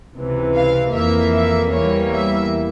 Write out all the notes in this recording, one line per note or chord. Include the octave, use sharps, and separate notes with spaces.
C#2 C3 E3
F5
F2 E3 A#3 E5
E5
E2 E3 G3 A#3 C#5
E5